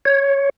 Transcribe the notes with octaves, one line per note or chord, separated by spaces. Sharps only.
C#5